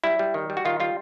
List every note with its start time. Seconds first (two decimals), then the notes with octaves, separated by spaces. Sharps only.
0.04 G3 E4
0.19 G3
0.34 D#3
0.50 G3
0.57 F#4
0.65 D#3 F4
0.80 G3 F4